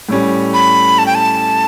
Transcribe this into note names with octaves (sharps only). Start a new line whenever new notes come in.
A2 G3 C#4
B5
A5
G5
A5